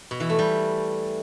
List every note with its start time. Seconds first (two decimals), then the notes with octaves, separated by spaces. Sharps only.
0.11 B2
0.20 E3
0.29 A3
0.39 G3